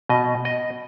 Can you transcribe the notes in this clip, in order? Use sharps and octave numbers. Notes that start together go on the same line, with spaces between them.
B2 D#5
D#5